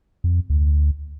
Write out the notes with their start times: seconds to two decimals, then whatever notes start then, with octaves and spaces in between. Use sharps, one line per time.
0.24 F2
0.50 D2